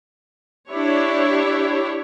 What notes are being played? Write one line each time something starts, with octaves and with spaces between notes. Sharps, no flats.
D4 E4 G4 C#5